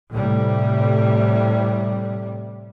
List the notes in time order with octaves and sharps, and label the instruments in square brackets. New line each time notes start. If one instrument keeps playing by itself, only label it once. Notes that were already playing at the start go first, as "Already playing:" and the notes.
[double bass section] A2 C3 G3